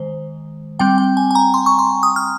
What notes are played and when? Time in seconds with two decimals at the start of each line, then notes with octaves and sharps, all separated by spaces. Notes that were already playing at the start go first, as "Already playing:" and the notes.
Already playing: D#3 G#3 C5
0.79 G3 C4 G5
0.98 G5
1.17 G#5
1.31 G#5
1.35 A#5
1.54 C6
1.66 C#6
1.79 C6
2.03 D#6
2.16 F6